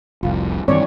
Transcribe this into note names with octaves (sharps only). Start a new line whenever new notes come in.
F1 C2 F4
G2 D#3 E3 C4 C#5 D5